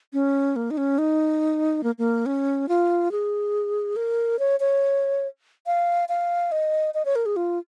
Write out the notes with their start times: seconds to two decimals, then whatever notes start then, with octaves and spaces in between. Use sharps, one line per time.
0.13 C#4
0.56 A#3
0.71 D#4
0.77 C#4
0.98 D#4
1.84 A#3
1.98 A#3
2.26 C#4
2.69 F4
3.12 G#4
3.96 A#4
4.39 C#5
4.60 C#5
5.66 F5
6.09 F5
6.52 D#5
6.94 D#5
7.05 C#5
7.16 A#4
7.26 G#4
7.36 F4